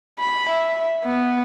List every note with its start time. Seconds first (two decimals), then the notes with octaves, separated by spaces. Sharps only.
0.19 B5
0.50 E5
1.04 B3